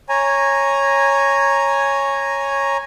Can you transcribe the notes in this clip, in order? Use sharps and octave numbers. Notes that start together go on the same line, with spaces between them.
C#5 G#5 A#5